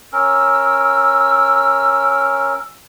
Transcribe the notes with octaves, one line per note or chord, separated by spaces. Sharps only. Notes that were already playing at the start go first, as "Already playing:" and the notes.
C#4 A#4 E6